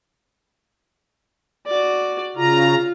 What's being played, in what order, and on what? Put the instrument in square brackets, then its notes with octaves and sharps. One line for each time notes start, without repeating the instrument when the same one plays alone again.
[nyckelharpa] F#4 D5
[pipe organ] C#3 A#5 [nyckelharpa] F4